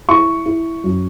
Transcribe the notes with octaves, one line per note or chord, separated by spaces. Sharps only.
E4 C#6
E4
F#2